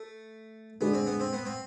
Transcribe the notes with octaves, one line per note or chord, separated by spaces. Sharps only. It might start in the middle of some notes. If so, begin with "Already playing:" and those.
Already playing: A3
D3 G#3 B3 D4 G#4
C4
B3
C4
B3
C4